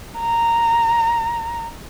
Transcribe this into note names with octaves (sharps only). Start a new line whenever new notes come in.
A#5